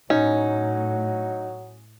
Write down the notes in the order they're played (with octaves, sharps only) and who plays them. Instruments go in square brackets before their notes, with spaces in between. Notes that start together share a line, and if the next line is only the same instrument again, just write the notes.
[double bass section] A2 [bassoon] F#3 [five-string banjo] C#4 [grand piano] D#4